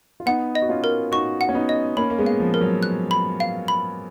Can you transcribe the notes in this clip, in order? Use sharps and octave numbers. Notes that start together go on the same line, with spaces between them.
F4
B3 D#4 F#5
D#5
F#4
C#4 F4
A#4
D#4 F#4 C#6
F#5
C#4
B3 D#4
D#5
A#3 C#4 B5
A#3
G#3 B3
F5
F3
A#4
F#3
F#6
B5
F5
B5